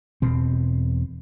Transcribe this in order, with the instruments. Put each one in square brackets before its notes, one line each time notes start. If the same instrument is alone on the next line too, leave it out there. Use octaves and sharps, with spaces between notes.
[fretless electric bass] E1 B2 C4